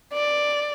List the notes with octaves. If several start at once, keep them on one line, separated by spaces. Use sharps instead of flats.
D5